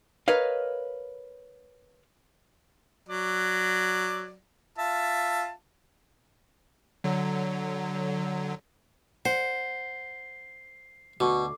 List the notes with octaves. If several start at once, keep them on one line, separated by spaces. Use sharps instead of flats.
A#4 B4 C#5 D#5 F5
F#3 D5
F4 E5 A5
D3 F#3
C5 F#5 C7
D2 B2 F#4 C#6 D6